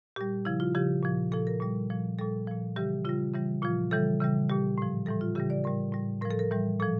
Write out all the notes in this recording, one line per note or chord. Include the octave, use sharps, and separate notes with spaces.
A#2 G3 G4
C#3 F3 E4
F4
C#3 F3 G4
A#2 F3
A#2 F3 A4
A#4
A#2 G3
A#2 F3
A#2 G3 A4
A#2 F3
C#3 E3 G3 G4
C#3 G3 F4
C#3 E3 G3
A#2 F3 F4
C#3 E3 G3 A4
C#3 E3 G3
A#2 G3 G4
A2 F3
A2 E3 G3 A4
F4
C#3 E3 G3 G4
D5
A2 G3 A#4
A2 G3
A2 F3 A#4
A4
A#4
A2 E3 G3
A#2 F3 A4